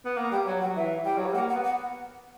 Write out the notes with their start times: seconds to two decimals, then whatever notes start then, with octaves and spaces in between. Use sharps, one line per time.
0.05 B3
0.16 A#3 F#5
0.31 G3 G5
0.46 F#3 F#5
0.61 F#3 F#5
0.76 E3 E5
1.05 G3 G5
1.17 F#3
1.26 G3
1.34 A#3 F#5
1.49 F#5
1.53 B3
1.64 F#5